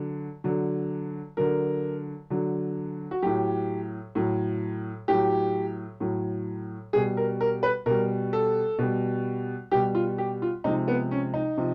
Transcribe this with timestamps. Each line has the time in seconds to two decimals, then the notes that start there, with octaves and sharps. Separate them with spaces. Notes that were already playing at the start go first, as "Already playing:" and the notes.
Already playing: D3 F#3
0.44 D3 F#3
1.37 D3 F#3 A#4
2.30 D3 F#3
3.11 F#4
3.22 A2 F#3 G4
4.15 A2 F#3
5.08 A2 F#3 G4
6.00 A2 F#3
6.93 B2 G3 G#4
7.17 A#4
7.41 A#4
7.63 B4
7.86 B2 G3 A#4
8.33 A4
8.78 B2 G3
9.71 G3 G4
9.75 B2
9.95 F4
10.18 G4
10.42 F4
10.64 C3 F3 G#3 D#4
10.88 B3
11.11 C#4
11.34 D#4
11.57 C3 F3